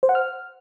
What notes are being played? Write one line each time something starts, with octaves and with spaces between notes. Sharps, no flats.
C5
F#5
F6